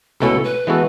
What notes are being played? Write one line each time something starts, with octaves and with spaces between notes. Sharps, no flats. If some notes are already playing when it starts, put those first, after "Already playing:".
C#2 B2 A3 C#4 E4 A4
B4
E3 G#3 B3 F#4 A4